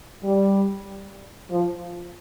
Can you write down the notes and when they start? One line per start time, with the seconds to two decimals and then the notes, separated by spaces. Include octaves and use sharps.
0.24 G3
1.51 F3